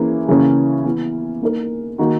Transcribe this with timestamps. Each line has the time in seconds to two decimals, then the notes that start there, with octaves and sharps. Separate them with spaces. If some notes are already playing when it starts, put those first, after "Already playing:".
Already playing: E3 A#3 C#4 G#4
0.28 C#3 E3 A#3 C#4
0.85 E3 B3 E4
1.42 A#3 D#4 A#4
1.98 D#3 A#3 D#4 F#4